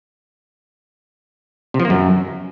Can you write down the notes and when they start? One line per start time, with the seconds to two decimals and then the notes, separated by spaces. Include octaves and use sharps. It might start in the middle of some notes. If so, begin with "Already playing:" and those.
1.74 C3
1.80 F3
1.85 A#3
1.90 F#2